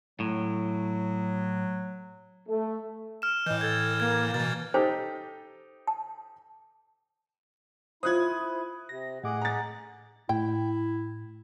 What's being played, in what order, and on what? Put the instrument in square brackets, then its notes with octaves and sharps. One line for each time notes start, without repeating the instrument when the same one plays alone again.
[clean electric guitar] A2 [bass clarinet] F#3
[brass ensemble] A3
[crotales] F6 E7
[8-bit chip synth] A2 E3 [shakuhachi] D#5 [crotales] G6
[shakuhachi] A4 [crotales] G#6 A6
[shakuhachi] A#3 [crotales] G#6
[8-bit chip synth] B2 E3 [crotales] A6
[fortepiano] D#4 G4 A4 [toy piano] C5
[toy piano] A5
[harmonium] E4 [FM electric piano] F4 C5 [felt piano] D#6 F#6 G#6
[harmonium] C3 [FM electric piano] A#6
[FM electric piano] A2 D6 [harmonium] G#4 D#5 F#5
[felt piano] A#5 A6
[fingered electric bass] A2 [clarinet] E4 [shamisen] G5